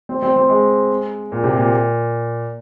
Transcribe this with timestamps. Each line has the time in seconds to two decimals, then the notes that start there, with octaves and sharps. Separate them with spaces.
0.09 C4
0.22 C4
0.36 C4
0.49 G#3
1.32 A#2
1.44 C3
1.57 A#2